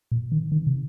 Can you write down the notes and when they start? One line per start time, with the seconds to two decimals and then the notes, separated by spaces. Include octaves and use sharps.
0.12 A#2
0.32 D#3
0.52 D#3
0.67 C3